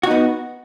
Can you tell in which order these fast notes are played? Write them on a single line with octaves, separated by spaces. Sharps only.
F#4 D#4 B3